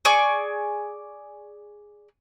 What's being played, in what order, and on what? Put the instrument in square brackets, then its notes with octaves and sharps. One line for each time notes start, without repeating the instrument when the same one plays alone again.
[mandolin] G#4 D5 C#6 D6